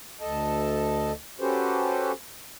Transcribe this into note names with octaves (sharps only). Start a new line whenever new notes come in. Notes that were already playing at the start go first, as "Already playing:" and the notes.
D2 A4 D#5 A5
C#4 F#4 G4 A4 B4 C5